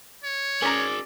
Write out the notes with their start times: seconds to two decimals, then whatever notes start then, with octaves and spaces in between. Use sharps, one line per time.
0.24 C#5
0.62 C#4 G#4 A#4 D5 A#5